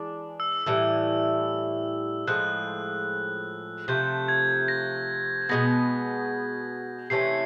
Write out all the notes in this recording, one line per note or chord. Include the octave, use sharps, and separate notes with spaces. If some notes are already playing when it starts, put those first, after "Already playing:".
Already playing: E3 G#3 D4
E6
A2 E3 G3 E6
A2 F3 G#3 F#6
C3 F3 A3 G6
G#6
A#6
B2 G#3 B3 A#6
C3 E3 A3 C#4 C7